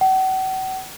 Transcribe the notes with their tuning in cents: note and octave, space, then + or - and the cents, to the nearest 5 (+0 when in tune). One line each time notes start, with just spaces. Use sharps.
F#5 +40